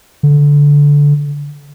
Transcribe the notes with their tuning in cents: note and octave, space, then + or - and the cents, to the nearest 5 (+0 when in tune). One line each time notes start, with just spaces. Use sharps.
D3 -15